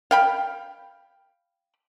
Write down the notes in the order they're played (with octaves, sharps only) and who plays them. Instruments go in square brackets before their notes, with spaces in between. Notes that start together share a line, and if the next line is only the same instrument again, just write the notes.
[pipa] F5 G5 B5